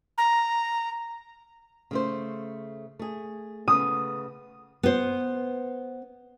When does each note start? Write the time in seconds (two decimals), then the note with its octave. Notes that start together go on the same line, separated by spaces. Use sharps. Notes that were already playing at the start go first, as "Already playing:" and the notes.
0.18 A#5
1.91 C#3 A3 C5
2.99 A3 G#4
3.68 C#3 A3 B3 D#6
4.83 B3 C5